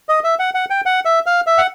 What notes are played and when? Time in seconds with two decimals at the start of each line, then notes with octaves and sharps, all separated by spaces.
0.09 D#5
0.24 E5
0.39 F#5
0.54 F#5
0.70 G5
0.86 F#5
1.05 E5
1.26 F5
1.47 E5
1.58 F#5